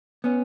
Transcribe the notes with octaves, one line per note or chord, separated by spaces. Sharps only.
B3 C#4